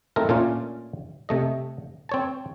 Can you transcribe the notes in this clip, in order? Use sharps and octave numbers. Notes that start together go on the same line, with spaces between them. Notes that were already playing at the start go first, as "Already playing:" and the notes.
A3 C4 D#4 E4 A4 A#4
A#2 A3 C#4 D4 F4
C3 A3 D#5
C4 C#5 A5